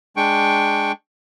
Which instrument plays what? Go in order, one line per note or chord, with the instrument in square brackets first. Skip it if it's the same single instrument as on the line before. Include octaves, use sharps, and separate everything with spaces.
[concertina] G#3 D4 G5 C#6